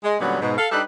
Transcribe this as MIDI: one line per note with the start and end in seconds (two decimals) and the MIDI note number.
0.04 0.16 56
0.20 0.39 46
0.20 0.39 50
0.20 0.39 54
0.20 0.39 55
0.20 0.39 59
0.20 0.39 61
0.41 0.57 44
0.41 0.57 47
0.58 0.68 69
0.58 0.68 77
0.72 0.81 55
0.72 0.81 62
0.72 0.81 63
0.72 0.81 67
0.72 0.81 69
0.72 0.81 71